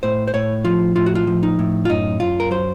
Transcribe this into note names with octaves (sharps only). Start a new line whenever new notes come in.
A2 C5
C5
A2 C#5
F3 F4
A2 F4
F#4
F4
F3
D#4
A2
F4
F#2 D#4
F#2 F4
A#4
F#3 C5